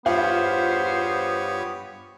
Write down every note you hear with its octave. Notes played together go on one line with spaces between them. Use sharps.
E2 G2 B3 F4 G4 C5 C#5